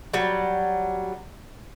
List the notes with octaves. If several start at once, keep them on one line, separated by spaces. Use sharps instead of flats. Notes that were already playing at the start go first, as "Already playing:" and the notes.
F#3 G3